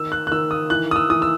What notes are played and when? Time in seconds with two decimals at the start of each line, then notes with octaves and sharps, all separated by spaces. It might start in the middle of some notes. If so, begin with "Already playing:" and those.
Already playing: D#3 E6
0.12 F#6
0.27 F#6
0.31 D#3 E6
0.51 D#6
0.70 E3 F#6
0.91 D#6
0.96 E6
1.09 E3 D#6
1.22 E6